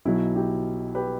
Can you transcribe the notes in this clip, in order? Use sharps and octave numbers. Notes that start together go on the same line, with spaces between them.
B1 B2 F#3 E4
E4 G4
G4 B4